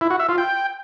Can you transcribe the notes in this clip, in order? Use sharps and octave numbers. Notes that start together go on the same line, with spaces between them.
E4
F#4
E5
F4
G5